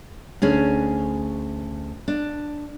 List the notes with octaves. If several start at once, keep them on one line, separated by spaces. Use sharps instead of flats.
D2 C#4 G#4
D4